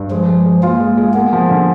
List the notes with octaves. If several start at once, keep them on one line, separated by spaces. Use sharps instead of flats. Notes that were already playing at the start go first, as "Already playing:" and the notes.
Already playing: G2
F3 G#3
G#3
G#3
A#3 F4
G#3
G#3
A#3 B3
F3
D3